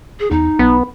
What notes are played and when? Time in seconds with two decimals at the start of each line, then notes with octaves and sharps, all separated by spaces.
0.20 G#4
0.31 E2 D#4
0.59 B1 B3